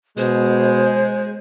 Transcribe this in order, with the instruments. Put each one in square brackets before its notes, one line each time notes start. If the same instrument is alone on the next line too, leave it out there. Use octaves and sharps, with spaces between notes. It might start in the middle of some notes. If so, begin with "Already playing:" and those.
[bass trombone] B2 [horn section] G#3 [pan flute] C5